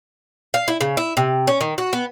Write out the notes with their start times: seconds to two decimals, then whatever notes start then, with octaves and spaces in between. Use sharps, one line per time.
0.54 F5
0.68 E4
0.81 C#3
0.97 E4
1.17 C3
1.47 C#4
1.61 D#3
1.78 F#4
1.93 B3